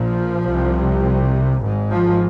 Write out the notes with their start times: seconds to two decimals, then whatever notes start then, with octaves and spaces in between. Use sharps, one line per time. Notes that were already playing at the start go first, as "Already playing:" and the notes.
Already playing: A#1 A#2 F3
0.47 C2 C3
1.62 G#1 G#2
1.90 F3